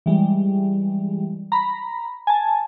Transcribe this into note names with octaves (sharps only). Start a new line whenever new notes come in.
E3 G3 G#3
A#5 B5
G#5 A5